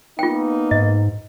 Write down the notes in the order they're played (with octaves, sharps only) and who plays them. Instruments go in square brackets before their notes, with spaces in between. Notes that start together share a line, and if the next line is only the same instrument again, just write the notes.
[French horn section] A#3 B3 D#4 [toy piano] F4 G5
[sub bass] G#2 [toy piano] D#5